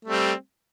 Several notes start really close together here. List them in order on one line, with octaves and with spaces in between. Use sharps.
A3 G3 C4